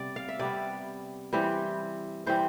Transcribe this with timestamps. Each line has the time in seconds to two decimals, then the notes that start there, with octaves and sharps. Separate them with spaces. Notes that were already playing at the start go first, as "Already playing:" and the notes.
Already playing: C3 G3 B3 D5
0.16 F5
0.29 E5
0.39 C3 G3 B3 D5
1.33 E3 G3 C4
2.26 E3 G3 C4 C5